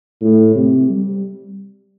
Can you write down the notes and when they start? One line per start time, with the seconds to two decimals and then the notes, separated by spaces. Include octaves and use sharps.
0.21 A2
0.55 C3
0.90 G3